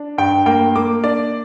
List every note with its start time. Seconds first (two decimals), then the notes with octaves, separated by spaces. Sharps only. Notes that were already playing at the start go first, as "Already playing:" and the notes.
Already playing: D4
0.18 G2 G5
0.46 A#3 G5
0.76 A#3 D6
1.04 D4 D5